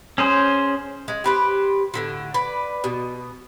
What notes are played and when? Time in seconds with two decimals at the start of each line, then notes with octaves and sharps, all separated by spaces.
0.18 C#4 G#4 C5
1.08 G#3
1.24 G4 B4 C5
1.94 A2 D3 F3
2.34 B4 D5
2.84 B2